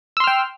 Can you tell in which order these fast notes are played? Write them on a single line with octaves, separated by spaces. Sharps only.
E6 C6 F6 G5